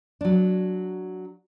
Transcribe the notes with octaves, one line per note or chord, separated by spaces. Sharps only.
F#3 D4